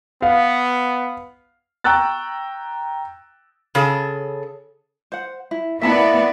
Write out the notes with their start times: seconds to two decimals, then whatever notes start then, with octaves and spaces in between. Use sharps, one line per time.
0.22 B3 F5
1.84 G5 A#5 C#6 E6 F#6 A6
3.75 C#3 G#4 A4
5.12 C5 F#5
5.51 E4
5.82 A#3 B3 E4 D5 E5 A5 B5